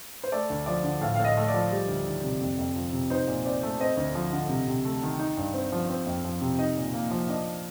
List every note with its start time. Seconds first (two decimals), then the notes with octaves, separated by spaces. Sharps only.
0.24 C5
0.32 A3 D5
0.50 D2
0.66 F3 D5
0.84 D3
1.01 A2 F5
1.16 A2 F5
1.25 D#5
1.37 A3
1.48 D5
1.54 F3
1.72 G3
1.88 D2
2.06 D#3
2.24 C3
2.41 F2
2.59 F2
2.76 F3
2.93 C3
3.10 D#4 C5
3.27 A#2
3.45 C4 D5
3.63 A3
3.80 C4 D#5
3.97 D2
4.15 F3
4.32 D3
4.49 C3
4.67 C3
4.85 A3
5.03 D#3
5.19 D#4
5.37 G2
5.54 C4
5.72 F3
5.89 C4
6.06 F2
6.24 F3
6.41 C3
6.59 D#4 D#5
6.77 A#2
6.94 A#3
7.11 F3
7.28 D4 D#5